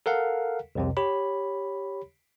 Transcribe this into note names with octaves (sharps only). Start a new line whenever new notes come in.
A4 A#4 F5 F#5
C2 F2 C3
G4 C#5 B5